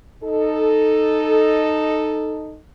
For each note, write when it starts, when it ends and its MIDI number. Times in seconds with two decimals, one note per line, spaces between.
0.23 2.57 63
0.23 2.57 69